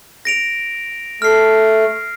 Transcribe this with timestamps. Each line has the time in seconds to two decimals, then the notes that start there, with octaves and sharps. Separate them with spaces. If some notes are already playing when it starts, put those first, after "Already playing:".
0.25 A#6 D7 F7
1.22 A3 F6 C7